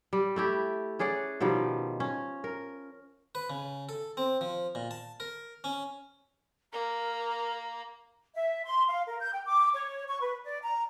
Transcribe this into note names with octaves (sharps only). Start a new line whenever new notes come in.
G3
A3 E4 G4
C#4 G#4 D5 F#5
B2 D#3 F3 G3
C#4
A#4
B4
C#3
A4
C4
F3
A#2
A5
A#4
C#4
A#3 A#4 A#5
E5
C6
F5
A#4
G6
G5
D6
C#5
C#6
B4
D5
A#5